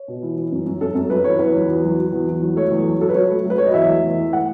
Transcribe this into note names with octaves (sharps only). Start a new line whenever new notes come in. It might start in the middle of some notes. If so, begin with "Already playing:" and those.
Already playing: C#5
B2
E3
E3
F#2
F#2
F#2 A4
F#2 A4
F#2 B4
E3 C#5
E2 B4
F#3
E2
F#3
F#3
E2
E2
F#3
A3 C#5
E2
F#3
F#3 A4
B4
F#3 C#5
A3
F#3 B4
F#3 C#5
D#5
E2 E5
A3
E2
E3
A3 F#5